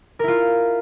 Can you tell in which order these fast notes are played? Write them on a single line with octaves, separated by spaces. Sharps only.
A#4 E4 F4